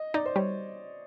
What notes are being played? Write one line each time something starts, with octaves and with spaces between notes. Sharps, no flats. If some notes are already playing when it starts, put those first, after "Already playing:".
Already playing: D#5
D#4 D5
C5
G3 C#5